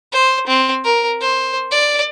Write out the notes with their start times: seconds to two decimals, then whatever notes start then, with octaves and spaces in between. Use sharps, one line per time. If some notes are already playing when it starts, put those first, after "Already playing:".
0.13 C5
0.47 C4
0.84 A#4
1.21 C5
1.71 D5